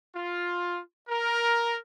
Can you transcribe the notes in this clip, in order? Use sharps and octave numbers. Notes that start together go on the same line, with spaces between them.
F4
A#4